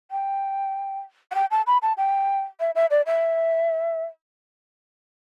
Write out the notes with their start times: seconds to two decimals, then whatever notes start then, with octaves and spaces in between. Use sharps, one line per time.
0.11 G5
1.31 F#5
1.35 G5
1.51 A5
1.67 B5
1.82 A5
1.97 G5
2.60 E5
2.75 E5
2.91 D5
3.06 E5